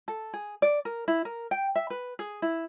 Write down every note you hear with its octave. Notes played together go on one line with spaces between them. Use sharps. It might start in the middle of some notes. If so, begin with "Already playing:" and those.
A4
G#4
D5
A#4
E4
A#4
G5
E5
B4
G#4
E4